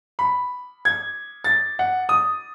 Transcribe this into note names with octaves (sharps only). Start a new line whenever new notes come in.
B5
G#6
A6
F#5
D#6